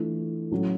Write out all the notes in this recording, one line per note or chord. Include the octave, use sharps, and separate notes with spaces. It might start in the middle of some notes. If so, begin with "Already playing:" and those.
Already playing: E3 A3 D4 F4
A2 F#3 A3 C#4